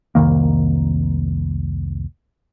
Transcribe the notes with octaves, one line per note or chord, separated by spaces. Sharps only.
C2 F2 D#3 A#3